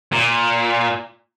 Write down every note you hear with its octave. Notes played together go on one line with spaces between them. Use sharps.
A#2